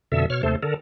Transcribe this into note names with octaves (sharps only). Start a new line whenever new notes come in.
F2 B2 D3 A4 E5
B2 C#5 F6
D#2 C3 A3 A4 C5
D3 A4 A#4